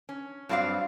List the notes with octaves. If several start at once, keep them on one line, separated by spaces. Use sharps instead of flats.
C#4
G2 F#3 C4 D5 F5